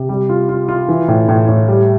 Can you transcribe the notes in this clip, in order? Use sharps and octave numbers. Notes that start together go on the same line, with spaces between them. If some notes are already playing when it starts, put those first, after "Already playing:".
Already playing: C3
G3
F4
F4
F4
E3
A2
A2
A2
G3